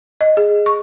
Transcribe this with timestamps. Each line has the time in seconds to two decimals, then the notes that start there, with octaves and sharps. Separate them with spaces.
0.21 D#5
0.37 G#4
0.66 C#6